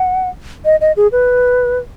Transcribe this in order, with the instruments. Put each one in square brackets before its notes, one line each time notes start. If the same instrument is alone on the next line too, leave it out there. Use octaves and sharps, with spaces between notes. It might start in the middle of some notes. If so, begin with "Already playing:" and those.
Already playing: [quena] F#5
D#5
D#5
G#4
B4